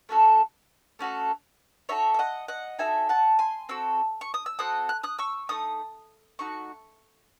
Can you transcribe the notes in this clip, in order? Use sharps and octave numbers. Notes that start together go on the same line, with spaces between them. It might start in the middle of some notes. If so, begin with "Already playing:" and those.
A3 C#4 F#4 A4
A3 C#4 F#4 A4
D#4 F#4 A4 C#5 E5
E5
D#5 F#5
D#5 F#5
D#4 F#4 A4 E5 G#5
F#5 A5
G#5 C6
C4 F#4 A4 E6
C#6
D#6
E6
C4 F#4 A4 D#6 F#6
F#6
D#6 F#6
C#6 E6
A3 D#4 D#6
A3 D#4 F#4 C#6